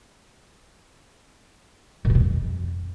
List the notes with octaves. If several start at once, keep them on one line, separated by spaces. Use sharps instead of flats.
A#2
E3
A#2
F2